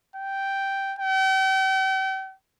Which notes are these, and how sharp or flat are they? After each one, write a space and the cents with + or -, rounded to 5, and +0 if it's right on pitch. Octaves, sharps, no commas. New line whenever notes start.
G5 -5
G5 -40